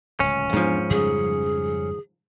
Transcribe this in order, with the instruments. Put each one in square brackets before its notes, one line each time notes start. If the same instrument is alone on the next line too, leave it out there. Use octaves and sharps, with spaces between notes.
[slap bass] D1 C#2 [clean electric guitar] C#4
[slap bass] E2 B3 D4 [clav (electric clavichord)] G#2 F3
[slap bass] F2 C#3 G3 [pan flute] G#4